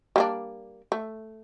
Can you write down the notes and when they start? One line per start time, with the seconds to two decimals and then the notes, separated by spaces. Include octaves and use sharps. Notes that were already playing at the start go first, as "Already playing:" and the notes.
0.16 G3 A#3 D4
0.92 A3